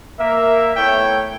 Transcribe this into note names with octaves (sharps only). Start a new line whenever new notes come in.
A#3 A#4 E5
A3 B3 E4 C#5 G5